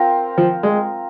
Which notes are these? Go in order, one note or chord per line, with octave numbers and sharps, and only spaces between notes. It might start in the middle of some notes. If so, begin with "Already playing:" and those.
Already playing: C4 F4 A#4
F3
G#3